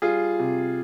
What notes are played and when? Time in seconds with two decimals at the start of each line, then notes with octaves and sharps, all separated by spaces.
0.02 G3 F4 G#4
0.40 C3